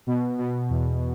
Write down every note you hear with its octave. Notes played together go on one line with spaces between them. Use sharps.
B2
B2
E2